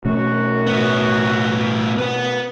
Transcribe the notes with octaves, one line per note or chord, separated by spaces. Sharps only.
F#2 B2 A3 C#4 F#4
A2 B3
B4 F#5